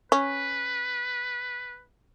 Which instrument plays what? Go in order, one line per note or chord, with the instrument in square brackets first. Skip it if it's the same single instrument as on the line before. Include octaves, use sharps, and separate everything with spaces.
[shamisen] C#4 [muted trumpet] B4